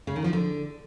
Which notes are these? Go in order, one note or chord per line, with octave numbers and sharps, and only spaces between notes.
C#3
D#3
F3
D3